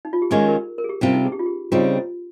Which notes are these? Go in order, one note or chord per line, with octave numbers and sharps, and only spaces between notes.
D#4
F4
G4
D#3 G#3 C#4 F4 G#4
A#4
A#4
G#4
G4
C3 G3 C4 C#4 F4
D#4
G#4
G4
F4
G4
C#3 G3 C4 D#4 F4